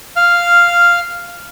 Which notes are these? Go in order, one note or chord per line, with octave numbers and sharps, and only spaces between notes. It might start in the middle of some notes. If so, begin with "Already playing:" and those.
F5 F6